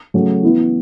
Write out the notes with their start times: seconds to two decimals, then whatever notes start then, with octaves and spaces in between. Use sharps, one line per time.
0.14 C#3 F#3 A3 C#4 F#4
0.43 E3 B3 E4